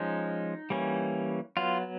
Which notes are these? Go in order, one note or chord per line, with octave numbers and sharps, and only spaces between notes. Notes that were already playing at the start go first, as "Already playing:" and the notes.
Already playing: F3 G#3 C#4 D#4
E3 G3 A#3 C#4
F#3 B3 F4